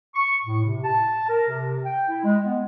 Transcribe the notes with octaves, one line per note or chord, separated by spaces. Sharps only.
C#6
A2
C3
A5
A#4
C3
G5
E4
G#3
B3